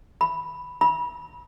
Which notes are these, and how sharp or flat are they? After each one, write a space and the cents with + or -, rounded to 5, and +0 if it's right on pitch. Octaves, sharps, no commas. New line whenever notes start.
B5 +0
B5 -30